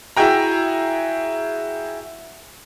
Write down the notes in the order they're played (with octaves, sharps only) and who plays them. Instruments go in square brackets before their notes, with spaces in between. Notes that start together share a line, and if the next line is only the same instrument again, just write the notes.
[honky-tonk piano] E4 F#4 G#4 G5 A#5